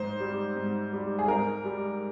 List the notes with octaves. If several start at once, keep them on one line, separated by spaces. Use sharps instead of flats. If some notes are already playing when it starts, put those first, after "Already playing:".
Already playing: G#2 C5
G3
G#2
G3
G#4
G#2 A#4
G3